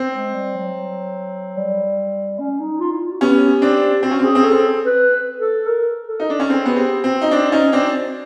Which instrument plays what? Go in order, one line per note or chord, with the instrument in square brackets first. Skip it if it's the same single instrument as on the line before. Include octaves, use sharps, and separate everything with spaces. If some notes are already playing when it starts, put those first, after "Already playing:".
Already playing: [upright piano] C4
[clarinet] G#3
G3
F#3
G3
C#4
D#4
F4
E4
F4
F#4
[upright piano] B3 C#4 [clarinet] G4
[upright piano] C4 D4
[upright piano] C4 [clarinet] F#4
[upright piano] C#4
C4
[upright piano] C#4 [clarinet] G#4
[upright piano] C4
[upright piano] C#4 [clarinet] A4
[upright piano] C4
[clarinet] B4
A4
A#4
A4
[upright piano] D#4
[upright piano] D4 [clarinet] A4
[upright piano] C#4
[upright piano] C4 [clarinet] G#4
[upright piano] B3 [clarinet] F#4
[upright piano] C4 [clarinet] G4
[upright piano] C4 [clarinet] F#4
[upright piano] D#4
C4 D4
C#4 D#4
C4 D4